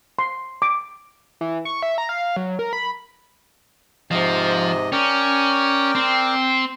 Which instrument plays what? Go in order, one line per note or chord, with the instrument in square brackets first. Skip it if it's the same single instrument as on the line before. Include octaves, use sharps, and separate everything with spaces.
[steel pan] C6
D6
[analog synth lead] E3
C#6
E5
A#5
F5
F#3
A#4
B5
[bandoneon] G#2 C3 D#5 [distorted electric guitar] F3
[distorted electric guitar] C#4 [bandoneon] A#4 D5 G5
[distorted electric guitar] C4